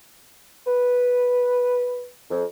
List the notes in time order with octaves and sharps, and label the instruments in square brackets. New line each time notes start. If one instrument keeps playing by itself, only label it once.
[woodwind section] B4
F2